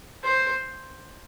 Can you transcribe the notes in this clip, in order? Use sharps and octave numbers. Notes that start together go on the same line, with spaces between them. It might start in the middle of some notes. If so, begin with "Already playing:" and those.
C5